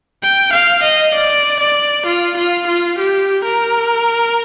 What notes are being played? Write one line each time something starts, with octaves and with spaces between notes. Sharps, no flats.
G5
F5
D#5
D5
D5
F4
F4
F4
G4
A#4